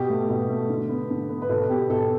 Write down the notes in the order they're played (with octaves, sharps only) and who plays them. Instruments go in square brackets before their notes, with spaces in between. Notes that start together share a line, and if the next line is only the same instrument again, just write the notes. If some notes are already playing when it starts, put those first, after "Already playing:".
Already playing: [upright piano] B2 G4
A3
B2
A3
D3
B3
D3
B3
B4
B2 A4
B3 G4
B2 A4